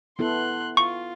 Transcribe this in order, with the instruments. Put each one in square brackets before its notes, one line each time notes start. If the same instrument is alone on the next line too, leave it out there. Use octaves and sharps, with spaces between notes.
[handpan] B3 E4 A4 [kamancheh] C6 F#6
[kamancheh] F4 [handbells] C#6